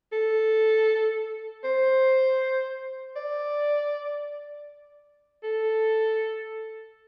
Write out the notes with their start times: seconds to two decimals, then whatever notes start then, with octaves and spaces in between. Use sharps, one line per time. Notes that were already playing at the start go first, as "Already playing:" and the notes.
0.13 A4
1.64 C5
3.16 D5
5.44 A4